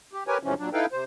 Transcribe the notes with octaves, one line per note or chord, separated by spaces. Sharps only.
G4
G4 A#4 B4 C#5 G#5
E2 G#2 C3 E3 F3 C#4
A#2 F#3 D4
D#4 E4 A4 B4 F5 G5
C3 C5